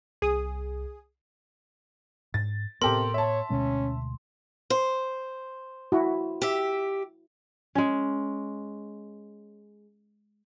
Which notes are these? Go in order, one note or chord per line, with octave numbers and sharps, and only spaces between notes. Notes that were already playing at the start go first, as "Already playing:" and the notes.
C2 G#4 D#6
G#2 A6
A2 C3 B3 G4 A4 A#4 C6
C#5 E5 A5
D2 B2 G#3 C#4
C5
E4 F#4
G4 E5
G#3 C#4